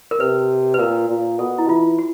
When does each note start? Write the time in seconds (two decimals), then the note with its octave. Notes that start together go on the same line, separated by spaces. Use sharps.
0.11 A#4
0.20 C3 B4
0.74 B4
0.79 A#2 A#4
1.10 A#2
1.39 B2 A4
1.58 E4
1.69 E3 F4
1.99 F#4